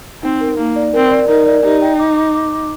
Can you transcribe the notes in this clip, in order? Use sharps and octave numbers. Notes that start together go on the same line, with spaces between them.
C4 D#4
A#4
A#3 D#4
D5
C4 A#4
D5
D#4 A#4
D5
D#4 G4
G5
D6
D6
D6
D6